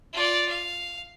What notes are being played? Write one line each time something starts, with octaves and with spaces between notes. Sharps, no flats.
F4 D5
F5